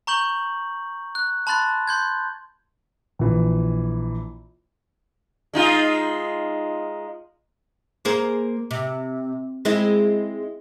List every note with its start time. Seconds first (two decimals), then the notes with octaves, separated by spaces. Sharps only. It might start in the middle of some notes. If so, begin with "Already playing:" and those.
0.07 A#5 C#6 G6 F#7
1.15 F#6
1.47 A5 B5 C6 F#6 A6
1.88 C6 G6 G#6
3.19 A#1 E3
5.53 G#3 D#4 F4
8.05 A#3 G#4 C5
8.71 C3
9.65 G#3 C4 E4